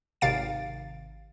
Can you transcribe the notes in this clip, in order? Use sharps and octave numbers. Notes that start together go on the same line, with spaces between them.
G#1 C3 F5 A6 D7